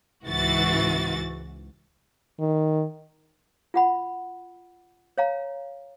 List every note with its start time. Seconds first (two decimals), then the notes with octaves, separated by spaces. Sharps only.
0.25 C#2 G#2 E3 F#4 A6
2.40 D#3
3.74 F4 F#5 B5
5.18 C#5 F5 A#5